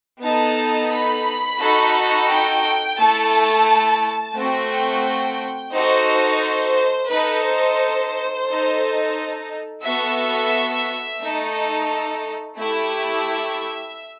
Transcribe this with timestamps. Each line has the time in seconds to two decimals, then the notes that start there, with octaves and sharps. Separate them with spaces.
0.22 B3 D#4 A4 A5
0.91 B5
1.60 D#4 F#4 A4
2.29 G5
2.97 A3 E4 A4 A5
4.34 A3 C4 F#4 G5
5.72 D#4 F#4 A4 C5
6.40 C5
7.09 D#4 A4 B4
7.44 C5
8.46 D#4 A4
9.83 B3 F#4 A4 E5
11.21 A3 D#4 A4
12.57 A3 E4 G4 E5